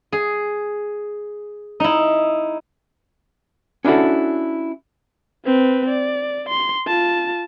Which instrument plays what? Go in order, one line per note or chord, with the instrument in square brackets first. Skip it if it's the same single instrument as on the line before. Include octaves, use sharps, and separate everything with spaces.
[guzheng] G#4
D#4 E4
[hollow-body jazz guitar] C#4 D4 E4 F#4 A4
[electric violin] C4 B4
D5
C6
F4 A5